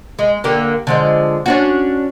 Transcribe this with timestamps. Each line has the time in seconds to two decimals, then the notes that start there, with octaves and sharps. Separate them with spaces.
0.19 G#3
0.44 D3 A#3 G4
0.87 D3 F3 G#3
1.46 C#4 D4 F#4